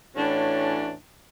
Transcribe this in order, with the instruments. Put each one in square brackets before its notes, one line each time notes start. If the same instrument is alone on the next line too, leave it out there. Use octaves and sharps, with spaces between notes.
[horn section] A2 E3 C#4 D4 F#4